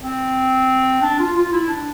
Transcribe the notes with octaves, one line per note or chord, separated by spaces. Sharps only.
C4
D4
F4
F4
E4
D4